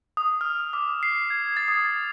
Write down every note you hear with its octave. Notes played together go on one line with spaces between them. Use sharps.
D#6
F6
D6
C7
G#6
A6
D#6